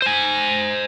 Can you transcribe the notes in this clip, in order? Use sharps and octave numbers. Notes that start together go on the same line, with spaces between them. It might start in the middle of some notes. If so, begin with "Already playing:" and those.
C5 G#5